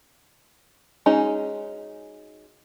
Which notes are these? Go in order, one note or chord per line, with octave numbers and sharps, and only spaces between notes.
G#3 C#4 D#4 F#4 G#4